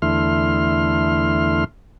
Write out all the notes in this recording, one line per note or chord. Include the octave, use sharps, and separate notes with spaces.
E2 D3 A3 E4 C6 F6